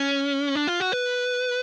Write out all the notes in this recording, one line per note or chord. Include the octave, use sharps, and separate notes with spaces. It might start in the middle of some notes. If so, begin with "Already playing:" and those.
Already playing: C#4
D4
F4
F#4
B4